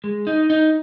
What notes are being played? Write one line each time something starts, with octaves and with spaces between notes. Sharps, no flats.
G#3
D#4
D#4